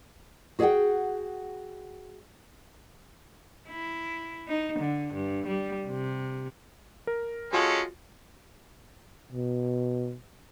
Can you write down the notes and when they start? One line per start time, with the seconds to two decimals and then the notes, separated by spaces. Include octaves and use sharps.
0.59 F#4 G#4 D5 E5 F#5 G5
3.69 E4
4.48 D#4
4.79 D3
5.13 G2
5.47 G3
5.86 C3
7.07 A#4
7.53 G#3 C#4 F4 F#4 A4
9.32 B2